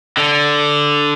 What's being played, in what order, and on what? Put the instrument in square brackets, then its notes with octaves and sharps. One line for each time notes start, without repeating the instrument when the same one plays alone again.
[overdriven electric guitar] D3